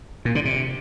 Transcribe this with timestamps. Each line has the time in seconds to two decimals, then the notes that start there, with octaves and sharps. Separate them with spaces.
0.25 A#2
0.35 D3
0.45 C3